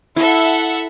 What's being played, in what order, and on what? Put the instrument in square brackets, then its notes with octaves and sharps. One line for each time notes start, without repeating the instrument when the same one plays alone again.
[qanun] E4 [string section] A4 E5 F#5